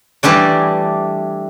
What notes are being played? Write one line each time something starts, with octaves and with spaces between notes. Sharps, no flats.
E3 G3 A3 D4 D5